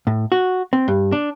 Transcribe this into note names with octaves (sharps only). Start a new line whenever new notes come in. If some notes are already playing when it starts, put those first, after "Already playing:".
A2
F#4
C4
G2
D4